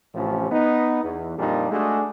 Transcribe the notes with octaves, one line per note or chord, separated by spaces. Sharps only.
A1 A2 C3 F3 C#4
B3 D#4
E2
F2 A#2 G3 D4 D#4
G#3 A3 D4 F#4 G#4